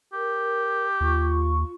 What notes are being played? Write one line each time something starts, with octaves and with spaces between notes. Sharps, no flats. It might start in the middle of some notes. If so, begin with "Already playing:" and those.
G4 A#4
D#2 F4 C#6